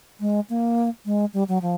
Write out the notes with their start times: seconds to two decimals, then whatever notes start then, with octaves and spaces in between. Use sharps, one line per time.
0.20 G#3
0.50 A#3
1.05 G#3
1.34 G3
1.48 F#3
1.62 F3